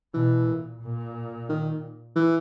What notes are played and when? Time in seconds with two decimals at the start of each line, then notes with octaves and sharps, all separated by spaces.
0.14 B2 E3
0.47 A#2
0.82 A#2
1.49 D#3
2.16 E3